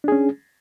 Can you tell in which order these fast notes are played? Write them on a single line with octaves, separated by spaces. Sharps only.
D4 G#4 C#4